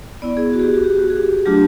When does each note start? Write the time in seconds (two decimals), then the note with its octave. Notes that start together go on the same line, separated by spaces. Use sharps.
0.22 B3 E4 D5
0.37 G#4
0.53 F#4
0.59 G#4
0.63 G4
0.74 F#4
0.83 G4
0.99 F#4
1.10 G#4
1.15 G4
1.46 F#3 A3 D4 F4 G4